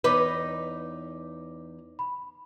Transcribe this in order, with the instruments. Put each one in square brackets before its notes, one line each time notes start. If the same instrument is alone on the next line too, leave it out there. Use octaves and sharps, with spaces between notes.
[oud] E2 D#4 B4 [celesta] C#5 D6
[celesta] B5